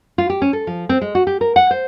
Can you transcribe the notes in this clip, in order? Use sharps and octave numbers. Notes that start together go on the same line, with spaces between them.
F4
G4
C#4
A4
F3
C4
G#3
F#4
G4
A#4
F#5
C5